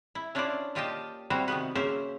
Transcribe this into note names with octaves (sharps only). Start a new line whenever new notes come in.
E4
C#4 D4 E4 F4 C5 D5
A#2 F4 G4 D#5 G5 A5
G3 C4 E4 F#4 C5
C3 D#3 B3 B4
C#3 A#3 C#4 C5 E5